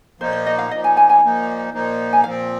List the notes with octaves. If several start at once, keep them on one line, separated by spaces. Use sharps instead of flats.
A#2 F3 A#3 D#4 C5
C5
D#5
F5
A#2 F3 A#3 D#4 D#5
G#5
G#5
G#5
A#2 F3 A#3 D#4
A#2 F3 A#3 D#4
G#5
A#2 F3 C4 F5